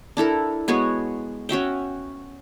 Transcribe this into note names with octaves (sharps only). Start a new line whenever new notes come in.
D4 E4 A4 A#4
G#3 B3 F#4 C#5
C#4 F#4 E5 G5